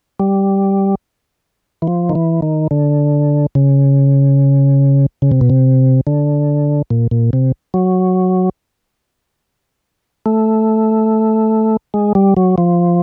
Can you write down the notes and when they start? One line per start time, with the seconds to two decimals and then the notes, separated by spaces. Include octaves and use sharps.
0.20 G3
1.82 E3
1.87 F3
2.09 D#3
2.15 E3
2.42 D#3
2.71 D3
3.55 C#3
5.22 C#3
5.32 C3
5.41 B2
5.50 C3
6.07 D3
6.90 A#2
7.11 A#2
7.33 C3
7.74 F#3
10.26 A3
11.94 G#3
12.15 G3
12.37 F#3
12.58 F3